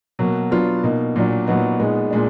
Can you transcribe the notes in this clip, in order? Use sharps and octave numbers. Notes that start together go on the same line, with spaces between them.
B2 F#3 A#3
F#3 B3 D4 F4
B2 A#3 D#4
A#2 F#3 D4
A#2 F#3 B3 D#4
A#2 G#3 B3 D#4
A#2 G#3 D4